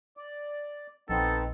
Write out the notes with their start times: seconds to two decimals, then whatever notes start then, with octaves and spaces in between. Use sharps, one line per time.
0.17 D5
1.09 A#1 B3 C4 D#4 A4